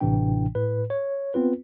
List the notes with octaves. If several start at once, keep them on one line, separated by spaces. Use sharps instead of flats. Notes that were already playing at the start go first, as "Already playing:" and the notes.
A1 A2 C3 E3 D4 G5
A2 B4
C#5
B3 C4 F4 B4